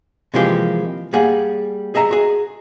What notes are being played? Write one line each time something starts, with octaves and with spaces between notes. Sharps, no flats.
C3 E3 F3 G#3 A#3 G4
G3 A#3 G#4 F#5
G#4 D#5 E5 A#5
F#4 G#4